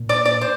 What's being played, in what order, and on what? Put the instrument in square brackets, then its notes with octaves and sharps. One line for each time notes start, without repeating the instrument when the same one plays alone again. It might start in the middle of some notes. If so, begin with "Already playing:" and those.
Already playing: [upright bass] A#2
[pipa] D5
D5
C5